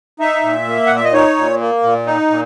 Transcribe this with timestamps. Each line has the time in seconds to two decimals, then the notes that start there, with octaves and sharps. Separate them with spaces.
0.20 D#4 E5
0.43 A#2
0.66 A#3
0.87 A#2 F#5
0.96 E5
1.05 D#5
1.13 D#4 C#5
1.37 A#2
1.60 A#3
1.83 A#2
2.06 D#4
2.30 A#2